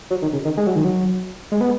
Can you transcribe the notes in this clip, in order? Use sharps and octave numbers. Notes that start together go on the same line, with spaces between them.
F#3
D#3
C#3
D#3
G#3
F#3
D#3
F#3
G#3
B3